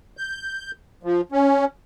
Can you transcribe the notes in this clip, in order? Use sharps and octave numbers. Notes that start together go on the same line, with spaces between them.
G6
F3
C#4